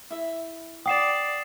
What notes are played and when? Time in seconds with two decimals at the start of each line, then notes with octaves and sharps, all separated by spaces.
0.11 E4 E5
0.86 D5 F#5 G5 D#6 C7 E7